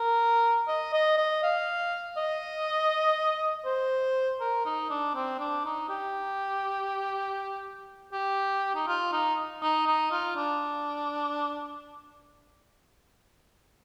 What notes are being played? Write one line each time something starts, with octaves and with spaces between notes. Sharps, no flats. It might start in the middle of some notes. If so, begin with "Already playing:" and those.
Already playing: A#4
D#5
D#5
D#5
F5
D#5
C5
A#4
D#4
D4
C4
D4
D#4
G4
G4
D#4
F4
D#4
D#4
D#4
F4
D4